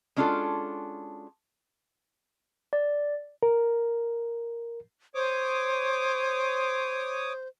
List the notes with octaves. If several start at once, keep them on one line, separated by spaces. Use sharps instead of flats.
G#3 C#4 D4 F4 F#4 A4
D5
A#4
C5 C#5 D6 D#6